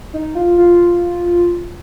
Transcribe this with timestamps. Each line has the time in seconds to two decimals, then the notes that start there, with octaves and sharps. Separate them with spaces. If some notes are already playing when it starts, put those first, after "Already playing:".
0.14 D#4
0.35 F4
0.58 F4